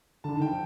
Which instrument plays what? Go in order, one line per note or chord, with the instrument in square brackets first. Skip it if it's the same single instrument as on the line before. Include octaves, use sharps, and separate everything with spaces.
[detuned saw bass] D3 [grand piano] A5
[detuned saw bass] D#3
[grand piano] G5
[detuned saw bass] F3